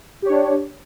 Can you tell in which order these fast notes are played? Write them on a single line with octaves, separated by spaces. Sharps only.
G4 C#5 D4